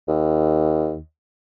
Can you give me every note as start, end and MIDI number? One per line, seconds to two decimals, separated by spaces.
0.08 0.98 39